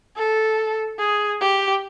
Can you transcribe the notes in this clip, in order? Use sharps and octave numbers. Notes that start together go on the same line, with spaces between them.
A4
G#4
G4